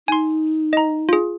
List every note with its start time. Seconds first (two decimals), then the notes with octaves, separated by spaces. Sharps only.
0.08 D#4 G#5 C6
0.73 D#5 A#5
1.09 F4 G#4